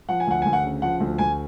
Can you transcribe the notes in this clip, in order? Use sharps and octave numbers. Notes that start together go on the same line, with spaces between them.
F3 F#5
G#5
D2 F#5
D2 G#5
F#5
C#3
F3 F#5
D2
D2 G#5